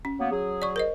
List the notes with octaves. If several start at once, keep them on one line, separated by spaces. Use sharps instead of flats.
C#4
F#3 A#3 B3
F#3 G#4
D5 C#6
A#4 C5 D#5